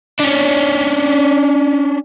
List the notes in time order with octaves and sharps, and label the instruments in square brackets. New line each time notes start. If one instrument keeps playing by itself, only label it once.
[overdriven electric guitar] C#4 D4